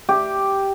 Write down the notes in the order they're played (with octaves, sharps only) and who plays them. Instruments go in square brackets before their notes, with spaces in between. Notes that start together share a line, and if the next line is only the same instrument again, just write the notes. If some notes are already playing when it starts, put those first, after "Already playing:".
[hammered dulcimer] G4